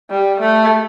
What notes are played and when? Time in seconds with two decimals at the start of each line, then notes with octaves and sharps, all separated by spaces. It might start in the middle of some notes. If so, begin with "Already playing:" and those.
0.10 G3
0.40 A3